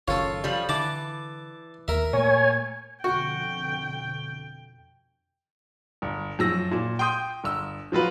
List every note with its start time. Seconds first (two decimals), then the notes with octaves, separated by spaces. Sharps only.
0.08 F#1 D#3 C#4 F4 A4 C#5
0.44 F3 G3
0.69 D3 E3 A5 D6
1.88 D#2 A#4 E5
2.13 A#2 A3 C#5 G#5
3.04 F2 B2 D3 F#4 G5 C#6
6.02 G1
6.39 F#2 F3 E6 A#6
6.71 A#2
6.99 G5 C6 D#6 G6
7.44 G1 E6
7.92 F3 F#3 F4 B4